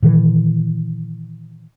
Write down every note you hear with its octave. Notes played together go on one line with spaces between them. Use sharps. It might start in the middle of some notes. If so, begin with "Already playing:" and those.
A#2 D#3 E3